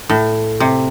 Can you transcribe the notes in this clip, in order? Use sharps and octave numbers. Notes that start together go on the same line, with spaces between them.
A2
C3